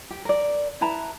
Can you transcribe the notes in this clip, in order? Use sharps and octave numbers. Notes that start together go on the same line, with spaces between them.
G4
A#4 D5
E4 B4 A5 A#5